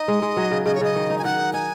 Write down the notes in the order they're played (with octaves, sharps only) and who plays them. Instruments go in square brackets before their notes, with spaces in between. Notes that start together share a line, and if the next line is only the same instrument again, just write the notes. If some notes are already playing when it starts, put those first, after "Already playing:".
Already playing: [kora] D#4 [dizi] D#5
[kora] G#3
G#3
F#3
C#3
[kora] C#3 [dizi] D#5
[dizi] C#5
[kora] C#3 [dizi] D#5
[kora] D#3
D#4
[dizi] G#5
[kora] D#3 [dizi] F#5
[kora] D#4
[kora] D#4 [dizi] G#5